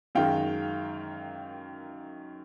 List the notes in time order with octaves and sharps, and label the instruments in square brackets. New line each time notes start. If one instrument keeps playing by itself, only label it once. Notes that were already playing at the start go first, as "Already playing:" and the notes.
[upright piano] F#2 D#3 G#3 F5 G5